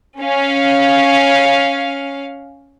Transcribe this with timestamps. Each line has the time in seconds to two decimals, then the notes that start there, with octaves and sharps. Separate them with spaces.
0.20 C#4 F5